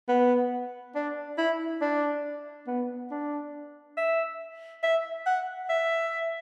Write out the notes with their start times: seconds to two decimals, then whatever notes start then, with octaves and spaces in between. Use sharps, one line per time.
0.08 B3
0.95 D4
1.38 E4
1.81 D4
2.67 B3
3.11 D4
3.97 E5
4.83 E5
5.26 F#5
5.69 E5